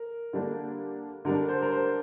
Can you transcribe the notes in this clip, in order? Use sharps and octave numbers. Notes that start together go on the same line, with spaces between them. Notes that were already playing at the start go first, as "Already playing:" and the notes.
Already playing: A#4
D3 G3 A#3 D4
D3 G3 D4 A#4
C5
A#4
C5